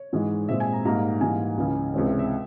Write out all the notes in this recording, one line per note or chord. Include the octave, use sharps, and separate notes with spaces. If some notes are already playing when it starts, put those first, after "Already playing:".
Already playing: C#5
G#2 E3 G#3
A#2 G#3 C4 E5
G#5
A#5
G#2 G3 A#3 A#5
G#2 E3 G3 A#3 G#5
C#2 C#3 E3
C#2 C3 E3 G#3 C4 C#5
E5
E5